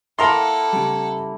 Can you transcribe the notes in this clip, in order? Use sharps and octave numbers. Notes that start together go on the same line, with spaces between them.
A#3 E4 A4 A#4 F#5 A#5 C6
C#3 G3